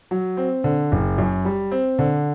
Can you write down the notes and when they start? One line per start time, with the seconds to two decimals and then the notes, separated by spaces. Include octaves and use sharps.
0.11 F#3
0.37 C4
0.64 D3
0.92 F#1
1.18 F#2
1.45 G3
1.72 C4
1.99 D3